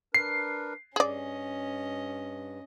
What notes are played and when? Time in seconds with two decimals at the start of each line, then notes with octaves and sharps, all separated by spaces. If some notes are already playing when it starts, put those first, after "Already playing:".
0.14 D4 A#4 B4 C7
0.96 G2 C#4 G#4 D5 D#5